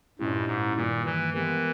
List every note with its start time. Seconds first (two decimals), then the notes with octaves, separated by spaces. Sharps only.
0.19 G2 A#2 G#3 C#4 E4 G4
0.47 G#2
0.76 G2 A#2 D#3 G3 A#3
1.05 E3
1.34 E3 G#3 B3 G4 A#4